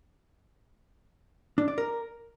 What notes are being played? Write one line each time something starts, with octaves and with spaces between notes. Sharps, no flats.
D4
D5
A#4